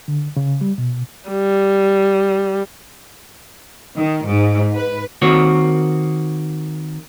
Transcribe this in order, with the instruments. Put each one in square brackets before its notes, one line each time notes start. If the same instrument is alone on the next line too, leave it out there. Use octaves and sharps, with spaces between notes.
[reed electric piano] D3
C#3
G3
B2
[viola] G3
[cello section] D#3
G#2
B4
[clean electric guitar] D#3 A#3 C4 F#4 C#5